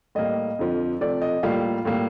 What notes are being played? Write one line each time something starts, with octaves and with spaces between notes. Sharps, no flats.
A2 G3 A#3 D#5
F2 D3 F3
C3 F3 A3 D5
D#5
A2 G3 A#3 F4
A2 G3 A#3